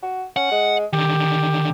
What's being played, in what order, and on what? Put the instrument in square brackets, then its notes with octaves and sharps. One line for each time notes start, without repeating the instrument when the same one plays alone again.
[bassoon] F#4
[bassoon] C#4 [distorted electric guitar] F#5
[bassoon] G#3
[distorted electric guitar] D3 D#3 [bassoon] G4